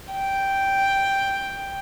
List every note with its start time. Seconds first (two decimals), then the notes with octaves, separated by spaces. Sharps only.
0.12 G5